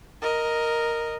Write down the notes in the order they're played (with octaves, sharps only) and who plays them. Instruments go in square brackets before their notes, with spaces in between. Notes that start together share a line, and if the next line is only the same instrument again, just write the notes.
[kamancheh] A#4 D#5